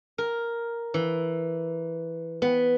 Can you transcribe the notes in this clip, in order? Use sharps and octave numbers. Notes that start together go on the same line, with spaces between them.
A#4
E3
B3